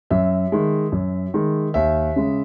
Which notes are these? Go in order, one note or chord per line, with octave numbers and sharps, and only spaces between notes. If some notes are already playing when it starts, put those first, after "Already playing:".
F#2 E5
D#3 G#3
F#2
D#3 G#3
D#2 E5
C#3 G#3